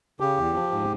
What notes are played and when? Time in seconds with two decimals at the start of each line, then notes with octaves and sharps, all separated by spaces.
0.20 C#3 G4
0.37 E2
0.54 F3
0.72 G#2